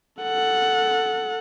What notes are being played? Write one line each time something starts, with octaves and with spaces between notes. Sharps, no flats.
A4 F#5